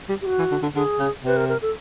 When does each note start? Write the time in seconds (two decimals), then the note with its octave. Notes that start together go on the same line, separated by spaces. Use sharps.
0.09 G3
0.21 G4
0.26 F#4
0.39 E3
0.51 D3
0.63 D3
0.75 D3 G#4
0.99 C#3
1.24 C3 B4
1.36 A#4
1.49 A#4
1.62 A4